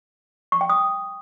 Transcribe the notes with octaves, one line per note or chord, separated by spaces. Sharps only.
C#6
G5
D#6